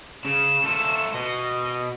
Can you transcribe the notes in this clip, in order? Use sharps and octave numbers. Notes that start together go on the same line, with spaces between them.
C#3 E7
A3 F4
B2 D#5